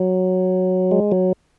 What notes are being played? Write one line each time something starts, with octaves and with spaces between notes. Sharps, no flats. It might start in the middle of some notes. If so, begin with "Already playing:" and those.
Already playing: F#3
G#3
F#3